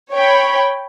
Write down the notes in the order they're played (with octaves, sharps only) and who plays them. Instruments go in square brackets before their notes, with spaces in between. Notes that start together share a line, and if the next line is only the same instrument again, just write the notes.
[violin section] C#5 G5 B5